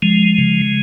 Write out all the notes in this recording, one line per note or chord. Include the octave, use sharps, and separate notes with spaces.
F3 G#3
C#3